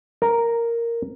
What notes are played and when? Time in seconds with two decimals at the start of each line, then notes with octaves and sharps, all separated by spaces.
0.22 A#4